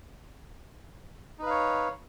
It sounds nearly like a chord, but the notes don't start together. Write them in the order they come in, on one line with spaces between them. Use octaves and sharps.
D#4 B4 F5 C#5